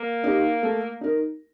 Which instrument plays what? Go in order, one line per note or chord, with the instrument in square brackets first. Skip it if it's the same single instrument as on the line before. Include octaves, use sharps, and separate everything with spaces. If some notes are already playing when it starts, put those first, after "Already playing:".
Already playing: [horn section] A#3
[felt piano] D#4 G4
A3
D#4 A#4